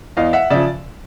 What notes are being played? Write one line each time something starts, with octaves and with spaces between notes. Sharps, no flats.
E2 D#5 F5
E5 F#5
C#3 F3 D5 E5